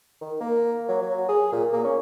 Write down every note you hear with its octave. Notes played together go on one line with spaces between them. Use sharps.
D#3
A#3
F#3
F#3
G#4
A#2
A#3
C#4